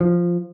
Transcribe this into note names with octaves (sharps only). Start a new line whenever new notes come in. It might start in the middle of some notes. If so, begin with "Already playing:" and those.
F3